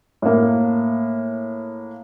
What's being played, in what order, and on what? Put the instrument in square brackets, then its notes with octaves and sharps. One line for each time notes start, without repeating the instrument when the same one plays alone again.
[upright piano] A2 A#3